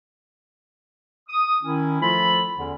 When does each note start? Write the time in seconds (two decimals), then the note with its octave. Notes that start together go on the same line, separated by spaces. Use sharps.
1.29 D#6
1.62 D#3 C#4 E4
2.01 F3 A3 F4 A4 B5
2.56 E2 D3 C#4